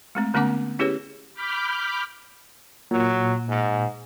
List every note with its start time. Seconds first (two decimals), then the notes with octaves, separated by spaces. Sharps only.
0.15 G#3 A3 C4
0.34 D3 A3 B3 C#4 F#5 D6
0.79 C#4 E4 G4 G#4 B4 C#5
1.34 B5 D6 F6 G6 B6
2.91 A#2 F#3
3.49 G#2